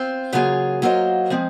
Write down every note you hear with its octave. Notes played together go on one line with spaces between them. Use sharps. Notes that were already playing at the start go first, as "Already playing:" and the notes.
Already playing: C4 F4 C5
C#3 F#3 A#3 F4 G#4
F#3 A#3 F4 C5 D#5
F3 G#3 C4